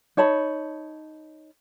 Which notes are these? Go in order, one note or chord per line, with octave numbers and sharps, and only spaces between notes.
D#4 C#5 A5 B5